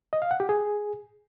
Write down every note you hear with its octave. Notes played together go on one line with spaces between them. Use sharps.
D#5
F5
F#5
G4
G#4